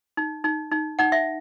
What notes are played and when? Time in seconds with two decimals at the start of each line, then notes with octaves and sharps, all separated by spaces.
0.17 D#4
0.44 D#4
0.71 D#4
0.99 D#4 F#5
1.12 E5